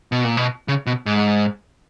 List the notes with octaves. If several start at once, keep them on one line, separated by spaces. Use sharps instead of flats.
B2
A#2
B2
C#3
B2
G#2